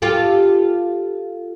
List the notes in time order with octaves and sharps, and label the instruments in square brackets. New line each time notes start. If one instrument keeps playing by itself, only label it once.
[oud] F4 G4 A4